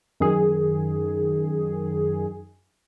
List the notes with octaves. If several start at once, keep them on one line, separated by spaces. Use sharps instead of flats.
F#2 D#3 G#4